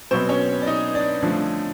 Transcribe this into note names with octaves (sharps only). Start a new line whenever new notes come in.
B2 F#3 B3 C4 C5
C#4 C#5
D5
D#4 D#5
D4 D5
D3 F3 A3